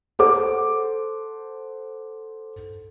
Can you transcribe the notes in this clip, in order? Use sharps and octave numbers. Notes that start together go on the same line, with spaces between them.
A4 C5 F#5 D6